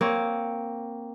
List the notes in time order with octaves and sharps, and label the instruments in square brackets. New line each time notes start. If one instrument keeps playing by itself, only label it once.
[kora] A#3 C4 C#5